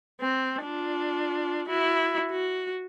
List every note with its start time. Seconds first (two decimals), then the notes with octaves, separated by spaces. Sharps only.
0.21 C4
0.62 D4 F4
1.69 E4 F#4
2.31 F#4